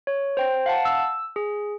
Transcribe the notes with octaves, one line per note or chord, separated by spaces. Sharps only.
C#5
C5 G5
F5 F#5 A5
E6
G#4